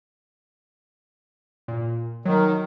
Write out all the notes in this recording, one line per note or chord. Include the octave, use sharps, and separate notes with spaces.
A#2
D#3 F#3